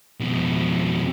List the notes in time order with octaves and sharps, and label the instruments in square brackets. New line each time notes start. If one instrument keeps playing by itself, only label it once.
[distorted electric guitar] F2 B2